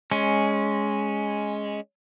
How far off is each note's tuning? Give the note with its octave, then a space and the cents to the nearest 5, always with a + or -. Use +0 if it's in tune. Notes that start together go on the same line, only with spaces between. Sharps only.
G#3 +0 C#4 +0